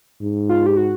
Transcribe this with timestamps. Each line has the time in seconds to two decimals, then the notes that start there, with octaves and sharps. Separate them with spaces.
0.21 G#2
0.49 F4
0.66 G4
0.77 F#4